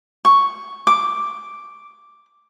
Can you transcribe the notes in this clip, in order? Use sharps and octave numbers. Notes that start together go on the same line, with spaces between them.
C#6
D6